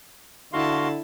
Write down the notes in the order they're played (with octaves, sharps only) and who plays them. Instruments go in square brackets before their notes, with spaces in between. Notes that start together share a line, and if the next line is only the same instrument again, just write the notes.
[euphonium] D3 [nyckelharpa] E4 A5 [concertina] F#4 F5 C6